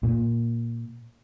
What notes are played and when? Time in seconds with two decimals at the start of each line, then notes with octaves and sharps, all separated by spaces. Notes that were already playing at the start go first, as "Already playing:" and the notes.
0.03 A#2